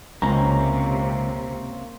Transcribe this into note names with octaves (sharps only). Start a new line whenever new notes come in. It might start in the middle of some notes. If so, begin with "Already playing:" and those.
C#2 C3 A#3 C4 C#4 A#5